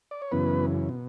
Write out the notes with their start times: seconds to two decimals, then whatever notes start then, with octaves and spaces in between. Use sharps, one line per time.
0.11 D5
0.22 C#5
0.32 F#2 C#3 E3 B3 B4
0.89 B2